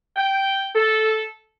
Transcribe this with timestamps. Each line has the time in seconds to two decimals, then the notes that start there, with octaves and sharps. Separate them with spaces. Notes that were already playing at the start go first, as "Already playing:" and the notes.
0.16 G5
0.75 A4